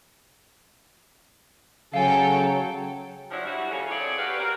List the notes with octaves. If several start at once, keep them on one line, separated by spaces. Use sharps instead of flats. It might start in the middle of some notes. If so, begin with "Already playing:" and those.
C#3 F#3 A4 C#5 F5 G5 G#5
F3 F#3 D4 E4
G3 E4 F#4
C#3 F3 C#4 A4 C#5
C4 G#4 C#5 D5
F#4 G4 B4 D5 F5
C4 F#4 A#4